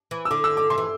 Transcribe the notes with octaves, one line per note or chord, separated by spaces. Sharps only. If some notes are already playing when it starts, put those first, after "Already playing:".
E3
E6
D3 D6
E6
D6
D3 C6
E3